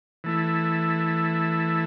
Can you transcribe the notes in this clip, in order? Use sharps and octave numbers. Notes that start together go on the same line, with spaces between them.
E3 A3 E4